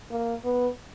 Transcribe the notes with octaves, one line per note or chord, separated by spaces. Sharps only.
A#3
B3